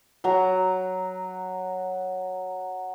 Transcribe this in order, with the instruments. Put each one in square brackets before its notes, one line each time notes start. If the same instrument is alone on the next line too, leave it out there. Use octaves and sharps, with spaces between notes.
[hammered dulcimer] F#3 A#5